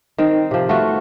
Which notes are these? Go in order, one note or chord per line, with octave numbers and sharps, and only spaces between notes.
D#3 C4
C3 F3
A3 B3 F4 F#4